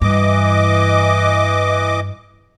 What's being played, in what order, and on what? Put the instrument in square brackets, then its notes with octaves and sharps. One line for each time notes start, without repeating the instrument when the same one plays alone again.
[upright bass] G2 [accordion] E3 D#5 D6